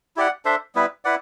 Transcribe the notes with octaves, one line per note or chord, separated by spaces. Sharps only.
E4 G4 D5 F#5
D4 A4 C5 E5
G3 B3 E4 B4
E4 B4 D5 F#5